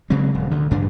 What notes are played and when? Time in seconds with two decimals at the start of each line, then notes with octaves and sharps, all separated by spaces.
0.10 C#3 F#3 G#3 C4
0.34 D#1
0.50 D2 D3
0.71 A1 G2 D4